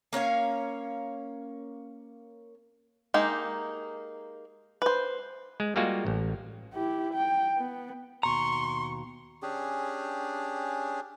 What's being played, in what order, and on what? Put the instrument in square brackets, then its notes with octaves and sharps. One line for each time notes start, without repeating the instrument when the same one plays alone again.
[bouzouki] A#3 C#4 C#5 F5
[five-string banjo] G#3 A#3 D#4 G4
B4 C5
[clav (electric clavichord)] G#3
G3 G#3 A#3 F4 F#4
A1
[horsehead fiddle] E4 G4
G5
B3
[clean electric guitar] D#2 B2 A#5 [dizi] C6 [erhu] C#6
[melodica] C#4 D4 G4 G#4